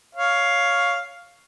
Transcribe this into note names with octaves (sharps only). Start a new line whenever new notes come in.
C#5 F5